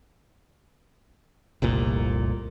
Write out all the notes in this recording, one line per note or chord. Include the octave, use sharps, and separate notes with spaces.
F1 C2 A#2